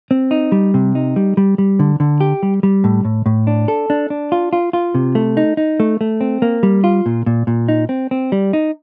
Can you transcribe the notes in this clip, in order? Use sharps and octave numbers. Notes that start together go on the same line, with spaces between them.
C4
D#4
G3
C3
D#4
G3
G3
G3
D3
D3
G4
G3
G3
A2
A2
A2
D4
A4
D4
D4
F4
F4
F4
C3
A3
D#4
D#4
A3
A3
C4
A#3
G3
F4
A#2
A#2
A#2
D#4
C4
C4
G3
D#4